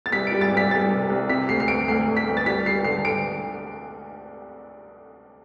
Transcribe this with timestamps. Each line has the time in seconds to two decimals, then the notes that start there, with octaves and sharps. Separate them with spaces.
0.06 A6
0.12 C2 B6
0.27 D7
0.32 G3
0.41 A6
0.52 C2
0.57 B6
0.71 G3 A6
0.90 C3
1.10 C2
1.29 C3 B6
1.49 D2 C7
1.60 C7
1.68 D2 D7
1.88 D2 C7
2.07 D2
2.17 B6
2.26 D2
2.37 A6
2.46 G3 B6
2.66 G3 C7
2.84 D3 C7
3.05 D3 D7